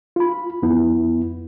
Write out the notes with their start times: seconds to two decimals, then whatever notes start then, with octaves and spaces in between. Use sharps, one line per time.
0.16 F4 B5
0.62 F2 B3 E4